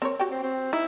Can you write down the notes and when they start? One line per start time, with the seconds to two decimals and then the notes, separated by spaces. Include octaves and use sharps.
0.02 C4 A#4 C#5
0.20 F#4 G4 G5
0.31 C4
0.43 C4
0.73 D#4 E4